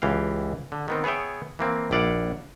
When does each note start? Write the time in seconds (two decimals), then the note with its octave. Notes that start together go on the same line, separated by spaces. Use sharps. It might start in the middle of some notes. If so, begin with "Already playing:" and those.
0.02 C#2 E3 G4 F5
0.72 D3
0.88 D#3 B3 C4
1.04 B3 G#4 C#5 E5 G5
1.59 E3 A#3 C4
1.91 A#1 E4 D5 F5 F#5